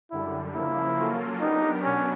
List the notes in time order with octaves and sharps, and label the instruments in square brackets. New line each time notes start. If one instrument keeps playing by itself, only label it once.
[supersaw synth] F#2 D3 G3 [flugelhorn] E4
[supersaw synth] C#3 F3 A#3 [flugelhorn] E4
[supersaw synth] F#3 A#3 C#4 F4 A4
[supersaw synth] F#3 B3 D4 G4 A#4 [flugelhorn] D#4
[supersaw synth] B2 F#3 B3 D4 [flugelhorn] C#4